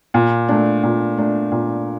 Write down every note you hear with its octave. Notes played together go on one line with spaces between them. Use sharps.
A#2
A3 D4
A#2
A3 D4
A#2